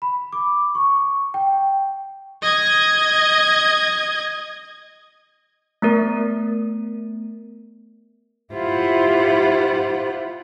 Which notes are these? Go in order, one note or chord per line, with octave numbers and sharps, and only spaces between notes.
B5
D6
C#6
G5
D#5 G#6
A3 B3 A#4
E4 F4 G4 C5 F#5